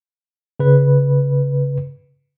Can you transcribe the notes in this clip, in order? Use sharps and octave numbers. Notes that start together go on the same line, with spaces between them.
C#3 B4